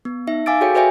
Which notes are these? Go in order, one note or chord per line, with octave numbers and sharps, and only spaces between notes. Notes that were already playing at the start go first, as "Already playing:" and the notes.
B3
D#4 E5
F5 G#5 D6 E6 A6 D7
F#4 G#4 A4 C#5 G5
F#4 B4 C#5 E5 G5 G#5